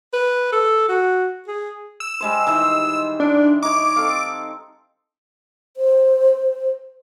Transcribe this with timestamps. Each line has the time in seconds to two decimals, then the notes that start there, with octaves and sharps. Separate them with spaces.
0.13 B4
0.52 A4
0.89 F#4
1.48 G#4
2.00 E6
2.20 G3 G#3 C5
2.47 D#3 E3 C5
3.20 D4
3.63 D#4 C#5 D6
3.96 C4 A4 F5
5.77 C5